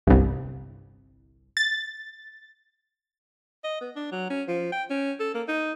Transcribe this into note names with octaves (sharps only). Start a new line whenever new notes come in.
G1 C2
A6
D#5
B3
D4
F#3
C#4
F3
G5
C#4
A4
A#3
D#4